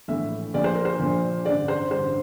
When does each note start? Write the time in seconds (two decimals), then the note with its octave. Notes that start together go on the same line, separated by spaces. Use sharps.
0.08 A#1 A2 E3 E5
0.54 A#1 A#2 F3 D5
0.64 C5
0.75 A#4
0.85 C5
0.99 A#1 A#2 F3
1.45 A1 G2 D3 D5
1.68 C5
1.91 A1 G2 D3 C5